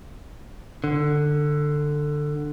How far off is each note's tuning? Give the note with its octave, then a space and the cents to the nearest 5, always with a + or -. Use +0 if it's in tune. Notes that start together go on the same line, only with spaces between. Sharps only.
D3 +15